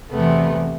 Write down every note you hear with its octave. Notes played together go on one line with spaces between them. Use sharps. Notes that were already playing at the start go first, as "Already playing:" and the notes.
E2 C3 E3 A3 B3